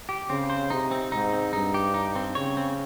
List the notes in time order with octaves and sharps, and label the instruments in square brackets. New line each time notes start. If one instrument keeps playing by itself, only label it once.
[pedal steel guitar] G4
[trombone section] C#3 [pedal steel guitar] C4
[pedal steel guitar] C5
[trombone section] C3 [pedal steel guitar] D#4
[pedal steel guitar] C4
[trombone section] G#2 [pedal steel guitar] D#4
[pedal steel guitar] C4
[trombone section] G2 [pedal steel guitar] D#4
[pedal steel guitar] G4
D#4
C4
[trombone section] C#3 [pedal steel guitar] C#5
[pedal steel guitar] C4